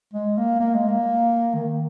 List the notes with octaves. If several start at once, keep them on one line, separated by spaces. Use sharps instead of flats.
G#3
A#3
A#3
G#3
A#3
D#3